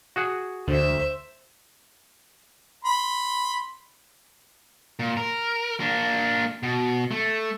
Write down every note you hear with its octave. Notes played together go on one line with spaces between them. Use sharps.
F#4 G#4 F#5
D2 D3 C5 E5
B5 C6
A#2
A#4
A#3 D4
B2
A3